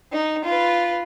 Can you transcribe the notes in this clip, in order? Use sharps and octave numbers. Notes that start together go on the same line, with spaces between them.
D#4
F4 B4